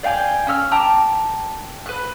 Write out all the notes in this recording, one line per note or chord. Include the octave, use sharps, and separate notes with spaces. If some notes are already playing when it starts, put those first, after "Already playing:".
D5 F5 G5 G#5
C#4 E6 F6
G5 A5 A#5 D6
B4 F#6